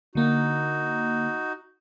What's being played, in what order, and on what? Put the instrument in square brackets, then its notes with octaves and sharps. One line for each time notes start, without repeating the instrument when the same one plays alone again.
[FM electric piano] D3 A#3 [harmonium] D#4 F#4